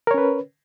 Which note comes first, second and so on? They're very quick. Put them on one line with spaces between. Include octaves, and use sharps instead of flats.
A#4 C#5 C#4 B4